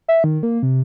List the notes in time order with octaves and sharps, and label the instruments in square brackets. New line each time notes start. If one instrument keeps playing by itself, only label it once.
[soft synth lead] E5
D#3
A#3
C3